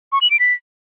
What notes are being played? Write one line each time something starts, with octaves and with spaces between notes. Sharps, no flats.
C#6
F#7
D7
B6